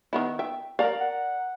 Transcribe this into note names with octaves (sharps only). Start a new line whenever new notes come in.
D#3 B3 E4
E5 G5
A#4 D5 F5 A#5
F#5